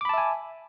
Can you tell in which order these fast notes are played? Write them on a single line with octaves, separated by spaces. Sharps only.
D6 B5 A5 E5 G#5